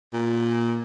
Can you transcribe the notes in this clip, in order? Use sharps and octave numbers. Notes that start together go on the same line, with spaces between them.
A#2